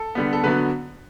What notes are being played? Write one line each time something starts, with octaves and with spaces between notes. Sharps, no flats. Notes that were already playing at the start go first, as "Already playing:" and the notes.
Already playing: A4
D3 G3 B3
A4
D3 F#3 B3 B4